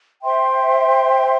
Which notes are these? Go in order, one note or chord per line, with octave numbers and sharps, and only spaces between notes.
C5 E5 G5 C6